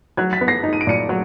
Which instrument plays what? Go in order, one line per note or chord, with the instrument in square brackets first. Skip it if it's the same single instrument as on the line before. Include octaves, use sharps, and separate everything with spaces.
[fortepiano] F#3 [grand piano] F#6 G#6
[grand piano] A6 B6
[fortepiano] B3
[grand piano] A#6 C7
[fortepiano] D#4
[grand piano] D#7
D7
[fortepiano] A#2 [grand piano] C#7 D#7
[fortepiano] F#3